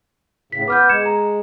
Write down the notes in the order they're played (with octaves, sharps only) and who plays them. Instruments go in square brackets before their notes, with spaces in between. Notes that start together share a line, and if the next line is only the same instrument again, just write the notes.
[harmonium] A2 C#3 [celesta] B6
[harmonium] B3 B4 [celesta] D6 F6 G6
[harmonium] G#3 [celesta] G#6 C#7 E7
[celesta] A#5